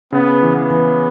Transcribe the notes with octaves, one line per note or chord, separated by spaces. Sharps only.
C#3 B3
E3
B3
E3